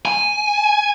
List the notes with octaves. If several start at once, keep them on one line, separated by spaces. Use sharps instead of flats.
G#5